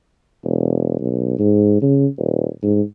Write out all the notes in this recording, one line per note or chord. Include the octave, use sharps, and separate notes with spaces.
E1
B1
G#2
C#3
D#1
G#2